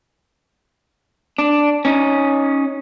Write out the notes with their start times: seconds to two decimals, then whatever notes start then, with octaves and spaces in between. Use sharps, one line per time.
1.39 D4
1.85 C#4 D#4